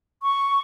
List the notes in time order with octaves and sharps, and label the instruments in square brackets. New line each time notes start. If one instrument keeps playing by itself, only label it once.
[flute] C#6